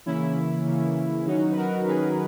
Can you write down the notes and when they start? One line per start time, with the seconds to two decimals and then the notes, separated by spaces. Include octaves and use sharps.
0.06 C#3 E3 A#3 C#4 E4
0.65 C#3 E3 A#3 C#4
1.26 D#3 F#3 C#4 D#4 F#4
1.52 B4
1.57 F#4 A#4
1.87 D#3 F#3 C#4 G#4 B4